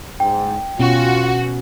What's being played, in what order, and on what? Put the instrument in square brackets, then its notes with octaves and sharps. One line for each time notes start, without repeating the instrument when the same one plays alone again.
[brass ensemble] G#2 [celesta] G5
[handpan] B2 C#4 [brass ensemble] F4 [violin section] F#4